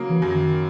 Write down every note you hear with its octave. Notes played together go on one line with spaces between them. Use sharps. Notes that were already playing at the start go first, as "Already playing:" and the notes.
Already playing: C#3 F#3 A#3
E3
F#2
D#3